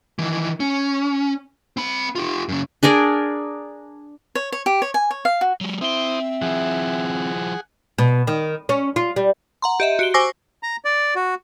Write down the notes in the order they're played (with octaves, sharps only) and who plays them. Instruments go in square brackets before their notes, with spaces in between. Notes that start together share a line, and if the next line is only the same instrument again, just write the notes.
[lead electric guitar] D#3 E3
C#4
C4 B5
F4 G4
F#2 C#3
[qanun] D4 G#4 A#4 D5
[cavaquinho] C#5
C#5
G4
C#5
G#5
C#5
F5
F#4
[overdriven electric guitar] F#3 G#3
[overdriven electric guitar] C4 C6 [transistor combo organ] E4 C5 D#6 [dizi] E5
[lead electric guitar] F3 E4 [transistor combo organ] G#4 F#5
[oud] B2
D#3
C#4
F4
G3
[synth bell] F#5 A#5 C6
G4 D#5 E5
F#4 D7 G7
C5 G#5 C#6 D6 E6 A#6
[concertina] A#5
D5
F#4